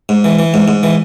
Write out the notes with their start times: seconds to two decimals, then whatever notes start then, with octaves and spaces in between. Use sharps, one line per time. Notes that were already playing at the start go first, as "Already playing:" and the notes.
0.09 G#2
0.24 E3
0.39 E3
0.54 G#2
0.68 G#2
0.83 E3